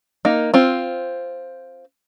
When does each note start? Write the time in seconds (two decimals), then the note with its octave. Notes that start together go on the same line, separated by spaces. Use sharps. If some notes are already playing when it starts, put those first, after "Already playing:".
0.25 A#3 D#4
0.54 C4 F4